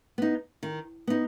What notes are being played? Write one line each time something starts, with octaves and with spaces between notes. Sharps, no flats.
B3 D#4
D#3
B3 D#4